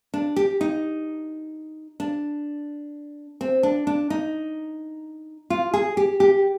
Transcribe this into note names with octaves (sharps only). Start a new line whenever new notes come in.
D4
G4
D#4
D4
C4
D4
D4
D#4
F4
G#4
G4
G4